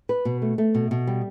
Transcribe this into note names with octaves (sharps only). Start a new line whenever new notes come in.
B4
B2
A3
A3
B2
B2
G3